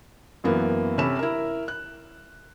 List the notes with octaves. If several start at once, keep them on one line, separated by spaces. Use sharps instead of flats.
F#2 E3 A#3 B3
C3 C#4 A4 B5 E7
E4 A#4
F#6